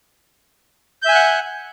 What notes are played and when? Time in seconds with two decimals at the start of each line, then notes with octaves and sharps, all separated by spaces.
1.02 G6
1.05 E5
1.08 G#5
1.12 F#6
1.15 F#5